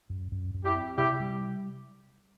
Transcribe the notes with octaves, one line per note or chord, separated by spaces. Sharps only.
F#2
F#2
F#2
E4 G4
C4
C3 E4 G4
G3